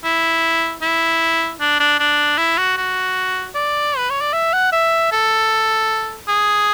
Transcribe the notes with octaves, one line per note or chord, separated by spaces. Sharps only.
E4
E4
D4
D4
D4
E4
F#4
F#4
D5
B4
C#5
D5
E5
F#5
E5
A4
G#4